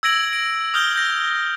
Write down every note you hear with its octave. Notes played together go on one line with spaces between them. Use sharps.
E6 G#6 A#6 D7 F#7
D7
D#6 F6 G6 G7
G6 A#6